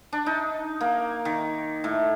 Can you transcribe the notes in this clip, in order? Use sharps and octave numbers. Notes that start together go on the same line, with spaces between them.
D4
D#4
A#3
D#3
A2